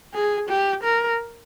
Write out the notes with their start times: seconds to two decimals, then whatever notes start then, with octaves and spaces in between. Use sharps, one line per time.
0.14 G#4
0.50 G4
0.84 A#4